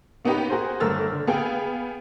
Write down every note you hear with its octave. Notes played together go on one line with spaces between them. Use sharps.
A#3 B3 C#4 D#4 G4 B4
F#4 G#4 A#4 C5
G1 A3 A#4 E6 F6 A6
D3
B3 G#4 F5 G5